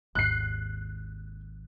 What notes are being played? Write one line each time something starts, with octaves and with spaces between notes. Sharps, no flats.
G#1 D#2 F#6 C7